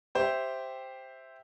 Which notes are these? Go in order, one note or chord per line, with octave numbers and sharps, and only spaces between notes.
G4 C5 E5 G5